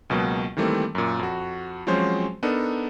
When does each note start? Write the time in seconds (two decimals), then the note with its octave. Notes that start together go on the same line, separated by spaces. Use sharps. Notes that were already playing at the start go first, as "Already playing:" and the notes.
0.10 C#2 B2 F#3 A#3
0.57 D#3 E3 G3 A3 A#3 C4
0.95 F#2 A#2
1.19 F2 F#4
1.87 F3 F#3 G#3 C4 C#4 C5
2.43 B3 D4 D#4 A4 A#4